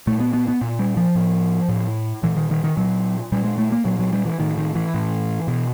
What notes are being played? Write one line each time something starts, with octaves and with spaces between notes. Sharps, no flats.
A#2 A3
B3
B3
B3
A#2
G3
F3
A2
A2
A#2 E3
D#3
D#3
D#3
A#2 F#3
A#2 G3
G#3
A3
A#3
A#2 F#3
F#3
G3
E3
A2 D#3
D#3
E3
A2
B2